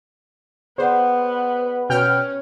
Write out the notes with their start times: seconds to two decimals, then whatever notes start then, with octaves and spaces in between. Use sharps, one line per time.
0.78 B3 G#4 B4 C5 D5 F#5
1.90 B2 C#4 G5 F6